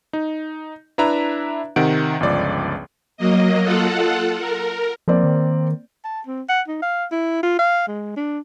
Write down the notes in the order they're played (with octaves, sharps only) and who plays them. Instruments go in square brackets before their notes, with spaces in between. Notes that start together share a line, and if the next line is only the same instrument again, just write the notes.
[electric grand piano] D#4
D4 E4 B4 E5 A#5
C3 D#3 F#5 D7
G1 C#2 F3 D5
[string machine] F#3 A#3 D#5
F4 A4 F#5
A#4
[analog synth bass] F3 [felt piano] A#3 C4 D5
[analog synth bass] D#3
[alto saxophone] A5
C4
F#5
D#4
F5
E4
F4
F5
G#3
D4